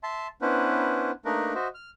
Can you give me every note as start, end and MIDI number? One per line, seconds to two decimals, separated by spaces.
0.03 0.27 76
0.03 0.27 81
0.03 0.27 84
0.42 1.11 59
0.42 1.11 61
0.42 1.11 62
0.42 1.11 64
0.42 1.11 71
0.42 1.11 72
1.25 1.54 57
1.25 1.54 58
1.25 1.54 62
1.25 1.54 63
1.25 1.54 70
1.25 1.54 71
1.55 1.68 66
1.55 1.68 72
1.55 1.68 75
1.55 1.68 76
1.74 1.90 89